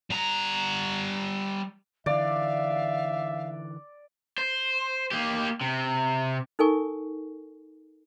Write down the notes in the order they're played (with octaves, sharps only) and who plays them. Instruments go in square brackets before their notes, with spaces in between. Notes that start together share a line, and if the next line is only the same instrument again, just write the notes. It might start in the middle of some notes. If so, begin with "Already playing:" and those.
[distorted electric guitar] G3 A#5
[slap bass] D3 E3 [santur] D5 [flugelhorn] E5 [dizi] F5
[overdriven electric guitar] C5
A#3 G4
C3
[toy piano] D#4 A4 A#4 G#5 C#6